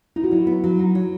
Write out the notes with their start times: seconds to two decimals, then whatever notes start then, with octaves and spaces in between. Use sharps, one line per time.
0.16 D#4 E4
0.24 F#4
0.31 F#3 E4
0.47 B3
0.64 F#3
0.79 D#4
0.95 F#3